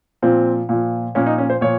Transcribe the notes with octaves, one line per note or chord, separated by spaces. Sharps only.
A#2 F3 C4
A#2 F3
A#2 F3 C#4
D#4
C#4
C5
A#2 F3 C#5